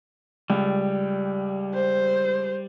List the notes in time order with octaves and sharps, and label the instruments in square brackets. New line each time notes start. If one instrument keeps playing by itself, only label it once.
[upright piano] C#2 [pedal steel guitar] G3
[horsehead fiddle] C5